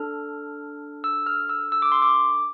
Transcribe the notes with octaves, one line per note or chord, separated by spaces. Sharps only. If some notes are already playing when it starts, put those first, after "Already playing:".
Already playing: D4 A4 F6
E6
F6
E6
E6
D6
C6
D6